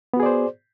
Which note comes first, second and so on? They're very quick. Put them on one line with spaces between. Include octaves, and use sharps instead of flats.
B3 F#4 G#4 D5 C5